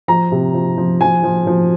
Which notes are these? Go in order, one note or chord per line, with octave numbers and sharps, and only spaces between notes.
F3 A#5
C3
F3
F3
F3 G#5
F3
F3